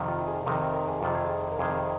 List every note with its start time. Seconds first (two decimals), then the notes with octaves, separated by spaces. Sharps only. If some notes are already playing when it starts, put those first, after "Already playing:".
Already playing: F2 C3 D#3
0.08 F4
0.27 G#4
0.46 F2 C3 D#3 A#4
0.74 A#4
0.88 G#4
1.01 F2 C3 D#3 F4
1.15 G#4
1.52 A#4
1.59 F2 C3 D#3 G#4